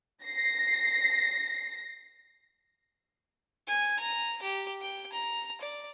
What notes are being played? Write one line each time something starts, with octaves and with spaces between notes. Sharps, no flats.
A#6 C7
G#5
A#5
G4
G5
A#5
D5